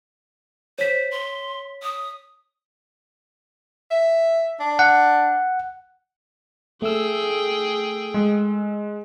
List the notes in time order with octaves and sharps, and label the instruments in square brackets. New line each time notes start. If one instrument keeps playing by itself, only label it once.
[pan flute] C5 [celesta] C#5 B6
[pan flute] C6
D#6
[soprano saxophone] E5
D4
[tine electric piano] F#5
[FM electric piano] A3 E6 [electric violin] G#4 G5
[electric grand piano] G#3